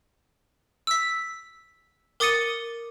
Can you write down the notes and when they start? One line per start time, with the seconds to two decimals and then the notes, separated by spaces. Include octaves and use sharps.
0.87 E6 B6
2.20 A#4 D6 D#6 A6 C#7 D#7